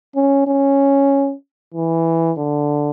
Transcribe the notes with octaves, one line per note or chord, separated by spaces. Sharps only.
C#4
C#4
E3
D3